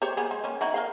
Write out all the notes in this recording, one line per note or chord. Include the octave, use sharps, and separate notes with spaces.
G4 C5 C#5
A#3 B3 G#4
G#3
A#3 C#4
D#4 E4 F#4
A#4 D#5 F5